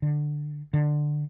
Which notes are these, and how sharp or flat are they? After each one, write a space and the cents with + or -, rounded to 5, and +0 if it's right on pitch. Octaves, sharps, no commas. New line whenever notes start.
D3 +15
D3 +15